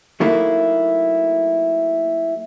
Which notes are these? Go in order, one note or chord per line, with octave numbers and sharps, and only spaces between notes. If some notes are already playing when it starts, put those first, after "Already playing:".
F#3 A3 A#3 D#4 E4